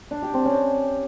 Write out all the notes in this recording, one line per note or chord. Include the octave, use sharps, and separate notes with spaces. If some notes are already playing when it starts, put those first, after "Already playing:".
D4
G4
C4
C#4